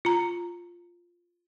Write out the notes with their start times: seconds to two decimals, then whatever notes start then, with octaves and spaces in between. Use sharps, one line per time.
0.05 F4 A#5